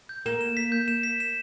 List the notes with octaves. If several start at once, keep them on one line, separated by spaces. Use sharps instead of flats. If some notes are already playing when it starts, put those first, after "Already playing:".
G6
A#3 E7
E7
B6
G6
E7
B6
E7